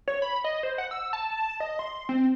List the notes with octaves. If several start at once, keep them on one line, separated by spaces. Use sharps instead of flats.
C#5
B5
D#5
C5
F#5
E6
A5
D#5
C6
C4